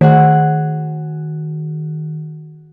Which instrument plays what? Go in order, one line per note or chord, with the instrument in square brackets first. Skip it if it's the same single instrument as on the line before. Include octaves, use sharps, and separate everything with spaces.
[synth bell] D#3 [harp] F#4 G#4 F#5